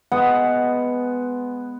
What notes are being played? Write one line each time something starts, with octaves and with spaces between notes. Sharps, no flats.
G#3 B3 F#5